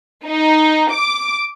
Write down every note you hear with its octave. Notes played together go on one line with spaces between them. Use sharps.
D#4
D6